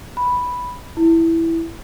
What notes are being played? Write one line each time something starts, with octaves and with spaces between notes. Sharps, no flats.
B5
E4